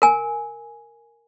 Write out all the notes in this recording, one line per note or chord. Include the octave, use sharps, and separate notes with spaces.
A#4 G#5